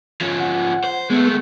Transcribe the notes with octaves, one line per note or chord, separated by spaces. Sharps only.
F3 C#4
F#5
C5
G#3 A3 B3